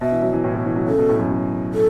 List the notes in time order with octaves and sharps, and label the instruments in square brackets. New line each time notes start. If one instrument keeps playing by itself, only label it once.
[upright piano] B2 [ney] E5
[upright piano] E3
F#3
E3
A2
B2
E3
F#3
[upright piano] C#3 [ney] A4
[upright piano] B2
A2
F#2
F#2
[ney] A4